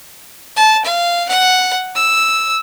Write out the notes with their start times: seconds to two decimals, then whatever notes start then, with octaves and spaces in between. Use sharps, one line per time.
0.56 A5
0.85 F5
1.29 F#5
1.95 E6